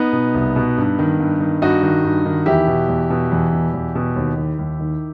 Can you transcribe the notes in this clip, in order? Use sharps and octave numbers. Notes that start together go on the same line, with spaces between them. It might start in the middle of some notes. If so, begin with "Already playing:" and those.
Already playing: B3 D#4
B2
C2
B2
G2
D#3
G2
D#3
G2 D#4 F#4
D#3
G2
D#3
E2 E4 G4
B2
E2
B2
E2
B2
E2
B2
D#2
D#3
D#2
D#3